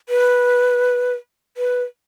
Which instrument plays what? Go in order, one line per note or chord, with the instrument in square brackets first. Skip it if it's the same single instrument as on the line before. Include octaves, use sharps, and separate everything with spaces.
[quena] B4
B4